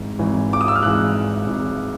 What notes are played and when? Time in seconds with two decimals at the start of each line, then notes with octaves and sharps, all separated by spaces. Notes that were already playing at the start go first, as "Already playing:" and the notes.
Already playing: G#1 G#2 E3
0.19 G#1 G#2 E3
0.53 D6
0.61 D#6
0.68 E6
0.76 F6
0.83 G#1 G#2 E3 F#6
1.47 G#1 G#2 E3